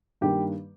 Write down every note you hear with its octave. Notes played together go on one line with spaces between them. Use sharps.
G2 D#3 G3 A#3 G4